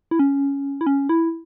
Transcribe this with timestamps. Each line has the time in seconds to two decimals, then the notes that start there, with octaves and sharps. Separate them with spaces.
0.11 E4
0.19 C#4
0.81 E4
0.87 C#4
1.09 E4